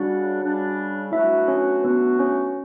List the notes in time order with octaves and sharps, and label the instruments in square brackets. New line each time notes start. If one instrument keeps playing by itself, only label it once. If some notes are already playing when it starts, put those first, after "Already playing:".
Already playing: [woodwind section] C#3 G3 D4 [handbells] F#4 F#5
[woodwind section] C#3 G3 D4
[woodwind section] B2 F#3 A3 D4 F#4 [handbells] E4 E5
[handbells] C#4 C#5
[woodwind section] B2 F#3 A3 D4 F#4 [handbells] B3 B4
[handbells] C#4 C#5